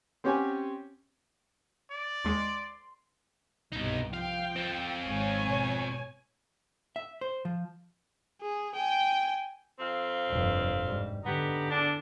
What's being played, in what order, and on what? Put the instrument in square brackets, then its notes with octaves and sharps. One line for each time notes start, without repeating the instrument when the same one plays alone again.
[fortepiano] C4 C#4 G4 C#5 F#5 G#5
[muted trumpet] D5
[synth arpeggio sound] D#2 G#3 D6 [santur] C6
[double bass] C2 G2 [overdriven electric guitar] B2 D#4
[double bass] F3 [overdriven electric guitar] F5 [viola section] G5
[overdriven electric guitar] C4 F4
[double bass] G#1 [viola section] C#5 G#5
[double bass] B2
[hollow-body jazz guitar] E5
C5
F3
[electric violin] G#4
G5 G#5
[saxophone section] F2 C4 F5
[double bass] F1 G2
G#2 G3
[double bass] D3 [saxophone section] B3 D#4 G4
[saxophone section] E2 D4